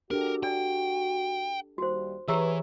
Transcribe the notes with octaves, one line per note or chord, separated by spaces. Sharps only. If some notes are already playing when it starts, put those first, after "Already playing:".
D4 F#4 G4 A4 A#4
D5 G5 G#5
D#2 G3 F#4 C5
E3 G4 G#4 B4 C#5 E5 A#5 E6